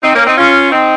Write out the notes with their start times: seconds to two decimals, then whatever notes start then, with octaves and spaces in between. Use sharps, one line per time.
0.03 C4 D#4
0.15 A#3 C#4
0.26 C4 D#4
0.37 C#4 F4
0.72 C4 D#4